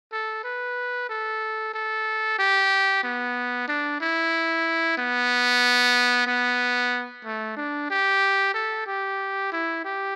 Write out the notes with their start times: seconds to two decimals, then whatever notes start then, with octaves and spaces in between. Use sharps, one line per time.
0.12 A4
0.44 B4
1.09 A4
1.74 A4
2.38 G4
3.03 B3
3.68 D4
4.01 E4
4.98 B3
6.27 B3
7.25 A3
7.57 D4
7.90 G4
8.54 A4
8.87 G4
9.52 E4
9.85 G4